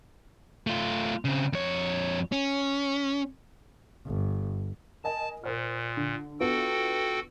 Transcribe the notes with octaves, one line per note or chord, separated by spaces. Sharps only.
A3 F4
C#3 C4
F2 C#5
C#4
G1
A#4 D#5 G#5 A5
A#2 A#4 C5 F6
D3
B3 D4 F4 F#4 A4 G5